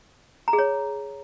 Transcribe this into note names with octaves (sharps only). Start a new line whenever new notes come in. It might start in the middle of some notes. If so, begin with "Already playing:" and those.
A#5
G#4
C#5